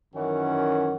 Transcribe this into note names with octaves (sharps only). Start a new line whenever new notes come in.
F#2 D#3 E3 C#4 F#5